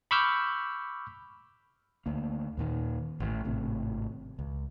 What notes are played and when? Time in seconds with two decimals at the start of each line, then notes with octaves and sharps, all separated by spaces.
0.11 B5 C#6 D6 E6 F6 G6
2.06 D2 A#3
2.57 D#2 A#2 D#3
3.20 A1 A2
3.44 G#1 A2 C3
4.39 C#2